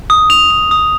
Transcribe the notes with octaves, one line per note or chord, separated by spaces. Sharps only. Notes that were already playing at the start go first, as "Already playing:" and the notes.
D#6
F7
F7
D#6